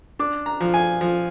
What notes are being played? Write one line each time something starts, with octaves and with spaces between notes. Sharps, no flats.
D4 D6
A#5
F3
G#5
F3